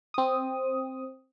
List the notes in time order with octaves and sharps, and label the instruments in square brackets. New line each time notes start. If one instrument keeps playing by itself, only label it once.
[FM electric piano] C4 D#6